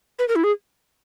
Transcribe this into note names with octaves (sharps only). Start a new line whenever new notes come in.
B4
A#4
E4
G#4